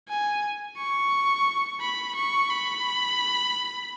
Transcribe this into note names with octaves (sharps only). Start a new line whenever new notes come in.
G#5
C#6
B5
C#6
B5